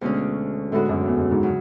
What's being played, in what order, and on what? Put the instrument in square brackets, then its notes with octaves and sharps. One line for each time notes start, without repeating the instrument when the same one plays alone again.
[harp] D2 D3 G#3 C#4 [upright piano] B2
[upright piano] A2 [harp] D3 G#3 B3 F#4
[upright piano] F#2
E2
F#2
G#2
[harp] C#3 F#3